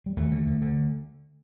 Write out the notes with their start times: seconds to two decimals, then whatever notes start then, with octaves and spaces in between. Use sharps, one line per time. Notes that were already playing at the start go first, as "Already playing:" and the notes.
0.06 G3
0.17 D#2 A3
0.32 D3
0.47 D3
0.62 D3